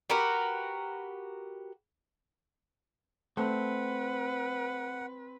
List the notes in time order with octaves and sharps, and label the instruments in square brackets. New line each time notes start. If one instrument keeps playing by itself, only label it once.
[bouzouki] F#4 G4 A#4 B4
[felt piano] A3 [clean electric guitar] C4 [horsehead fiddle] B4 [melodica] F#5